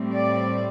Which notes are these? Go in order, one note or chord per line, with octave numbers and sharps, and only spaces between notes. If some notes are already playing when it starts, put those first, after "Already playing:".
Already playing: A2 G3 C4
D5